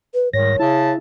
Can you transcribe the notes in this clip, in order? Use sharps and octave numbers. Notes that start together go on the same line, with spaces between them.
B4
C2 G#2 D#3 C#5 A#6
C#3 E4 A5